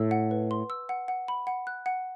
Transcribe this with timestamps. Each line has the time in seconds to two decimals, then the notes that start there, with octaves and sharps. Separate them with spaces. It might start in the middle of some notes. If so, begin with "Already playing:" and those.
Already playing: A2 E6
0.11 F#5
0.31 B4
0.51 C6
0.70 E6
0.89 F#5
1.08 F#5
1.28 B5
1.47 F#5
1.67 F#6
1.86 F#5